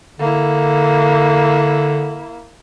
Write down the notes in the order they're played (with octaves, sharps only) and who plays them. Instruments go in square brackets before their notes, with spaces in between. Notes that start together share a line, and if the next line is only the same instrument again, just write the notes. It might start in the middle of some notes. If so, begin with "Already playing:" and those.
[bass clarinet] D3 [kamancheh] A#3 E4